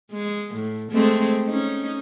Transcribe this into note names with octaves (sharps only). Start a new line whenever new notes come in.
G#3
A2
G#3 A3 C4
C#4 D#4